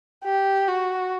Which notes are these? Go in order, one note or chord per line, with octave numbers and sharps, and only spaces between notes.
G4
F#4